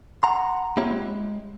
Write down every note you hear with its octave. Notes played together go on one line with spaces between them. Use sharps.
F#5 A#5 C6
A#3 C4 E4 F4 G4 C#5
G#3